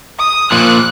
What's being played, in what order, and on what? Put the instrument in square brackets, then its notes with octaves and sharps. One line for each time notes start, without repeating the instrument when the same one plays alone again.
[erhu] D#6
[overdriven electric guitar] A#2 F3 [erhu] F#6